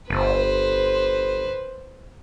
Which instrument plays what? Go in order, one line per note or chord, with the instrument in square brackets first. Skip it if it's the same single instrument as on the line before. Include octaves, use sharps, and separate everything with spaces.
[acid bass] G1 [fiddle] B4 C5